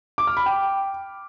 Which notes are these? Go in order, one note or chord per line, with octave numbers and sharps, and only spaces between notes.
D6
F6
B5
G5